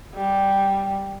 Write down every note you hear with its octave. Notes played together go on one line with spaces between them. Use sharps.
G3